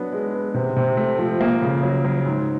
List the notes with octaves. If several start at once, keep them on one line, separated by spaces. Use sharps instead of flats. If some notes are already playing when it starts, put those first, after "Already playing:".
Already playing: F#3 B3 D4
G#3
B3
C3
C3
A3
F3
A#3
C#3
F#3
F#3
G#2